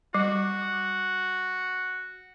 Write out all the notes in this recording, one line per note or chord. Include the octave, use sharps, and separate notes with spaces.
G3 F#4